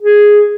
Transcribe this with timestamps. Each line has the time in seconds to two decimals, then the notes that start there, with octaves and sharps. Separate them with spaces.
0.01 G#4